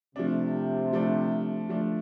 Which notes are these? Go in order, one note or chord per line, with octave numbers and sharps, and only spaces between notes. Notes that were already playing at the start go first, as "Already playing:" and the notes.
C3 F3 A3 D4
F3 A3 D4
F3 A3 D4